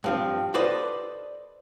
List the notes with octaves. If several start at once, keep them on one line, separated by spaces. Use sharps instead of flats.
G2 F3 C4
A4 B4 C5 D5 D#5 B5